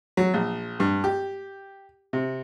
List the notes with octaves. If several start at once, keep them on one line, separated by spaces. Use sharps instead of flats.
F#3
A#1
G2
G4
C3